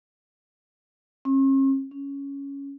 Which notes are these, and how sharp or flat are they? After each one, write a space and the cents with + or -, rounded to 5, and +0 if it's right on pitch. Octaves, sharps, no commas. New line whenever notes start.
C#4 -45
C#4 +5